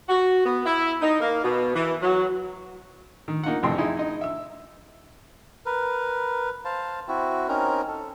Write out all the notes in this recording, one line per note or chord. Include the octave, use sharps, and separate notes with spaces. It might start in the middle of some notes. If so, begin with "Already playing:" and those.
F#4
B3
E4
D#4
A#3
B2
E3
F#3
D#3
A#3 D#4 F4 F#5
A1 F2 C3 E3 G5 C6
D#4 E4 G#4
D#4 D#5
E5 E6
A#4 B4
C5 F5 A5
C4 E4 F#4
C4 C#4 D#4 A#4
A4